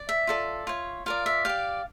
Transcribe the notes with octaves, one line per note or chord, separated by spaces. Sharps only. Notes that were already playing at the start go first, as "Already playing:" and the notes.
Already playing: D5
E5
F4 A4 D5
F4 C#5
F4 A#4 D5 F5
E5
G4 D5 F5